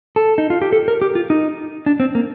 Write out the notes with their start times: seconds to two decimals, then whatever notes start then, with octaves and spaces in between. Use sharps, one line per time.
0.16 A4
0.38 D#4
0.50 F4
0.62 G4
0.73 A4
0.88 A#4
1.02 G4
1.15 F4
1.30 D#4
1.86 D4
2.00 C4
2.15 A#3